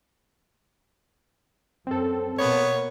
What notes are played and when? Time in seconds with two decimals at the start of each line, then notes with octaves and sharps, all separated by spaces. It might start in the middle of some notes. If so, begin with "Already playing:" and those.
1.87 F#2 C4 A4
2.39 B2 A#3 B3 C#5